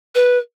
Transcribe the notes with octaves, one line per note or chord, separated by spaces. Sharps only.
B4